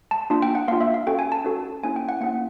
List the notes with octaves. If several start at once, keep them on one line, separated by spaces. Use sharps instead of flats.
A5
A#3 D4 F4 A5
G5
F#5
A#3 D4 F4 F5
E5
F5
C#4 F#4 A4 G5
G#5
A5
C#4 F#4 A4
A#3 C#4 E4 G#5
G5
F#5
A#3 C#4 E4 F#5